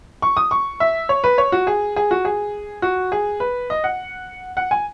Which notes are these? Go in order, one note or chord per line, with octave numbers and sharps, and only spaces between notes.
C#6
D#6
C#6
E5
C#5
B4
C#5
F#4
G#4
G#4
F#4
G#4
F#4
G#4
B4
D#5
F#5
F#5
G#5